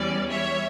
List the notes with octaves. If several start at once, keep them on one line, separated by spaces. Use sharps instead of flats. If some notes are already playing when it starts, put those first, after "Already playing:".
Already playing: E2 E3 G3 C#4 D5
C#5 E5